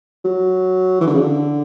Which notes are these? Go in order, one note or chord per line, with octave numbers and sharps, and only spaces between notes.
F#3
E3
D3
C#3
D3